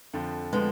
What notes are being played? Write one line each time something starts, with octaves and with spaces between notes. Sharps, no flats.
F2 D3 F3
D3 F3 G#3 B3